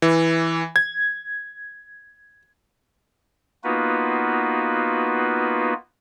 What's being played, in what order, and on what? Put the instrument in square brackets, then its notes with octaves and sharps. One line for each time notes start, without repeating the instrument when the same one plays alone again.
[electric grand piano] E3
G#6
[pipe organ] A#3 B3 D#4 F4 F#4 B4